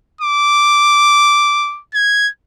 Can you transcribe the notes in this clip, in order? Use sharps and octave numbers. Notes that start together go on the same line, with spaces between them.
D6
G#6